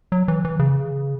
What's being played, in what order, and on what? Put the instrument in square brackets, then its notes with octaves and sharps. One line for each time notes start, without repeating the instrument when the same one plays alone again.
[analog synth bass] F#3
E3
E3
C#3